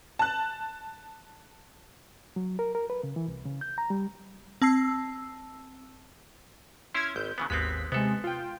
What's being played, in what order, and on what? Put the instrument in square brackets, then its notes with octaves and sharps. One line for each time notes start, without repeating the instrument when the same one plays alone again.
[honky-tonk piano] A5 F#6
[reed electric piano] F#3
A#4
A#4
B4
C#3
E3
C2
C#3
G6
A#5
G3
[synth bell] C4 A5 E6 C7
[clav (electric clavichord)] C#4 E4 [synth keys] C6 F6 G#6
[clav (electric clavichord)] G#1 [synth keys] G6
[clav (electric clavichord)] C#3 E3 B3
[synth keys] G#1 D#2 B6 [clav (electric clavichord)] G#3 B3 C4
[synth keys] C3 G#3 [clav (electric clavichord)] B3 A4
[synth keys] F4 G5